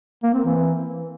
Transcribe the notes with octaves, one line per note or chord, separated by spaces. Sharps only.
A#3
C4
E3